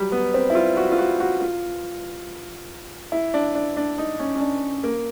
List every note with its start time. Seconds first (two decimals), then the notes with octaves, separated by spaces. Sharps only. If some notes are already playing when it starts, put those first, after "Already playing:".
Already playing: F#3 G3
0.12 B3
0.34 C4
0.50 E4
0.55 F4
0.77 F#4
0.92 F4
0.98 F#4
1.20 F#4
1.41 F4
3.12 E4
3.34 D4
3.55 D4
3.77 D4
3.98 D#4
4.19 C#4
4.35 C#4
4.40 D4
4.84 A#3